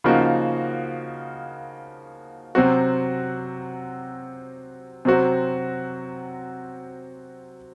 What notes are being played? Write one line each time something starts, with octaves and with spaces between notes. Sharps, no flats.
C#3 F3 A#3 D#4 F#4
C3 F#3 C4 F#4
C3 F#3 C4 F#4